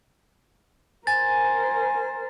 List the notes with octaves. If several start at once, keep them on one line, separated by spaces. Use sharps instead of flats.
A#4 C5 G#5 A6